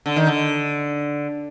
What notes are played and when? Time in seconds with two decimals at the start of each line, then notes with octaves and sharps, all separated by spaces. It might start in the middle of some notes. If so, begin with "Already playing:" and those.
0.06 D3
0.16 D#3
0.27 D3